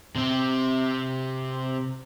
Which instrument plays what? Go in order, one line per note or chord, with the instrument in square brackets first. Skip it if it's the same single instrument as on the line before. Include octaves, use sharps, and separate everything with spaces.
[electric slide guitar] C3 C4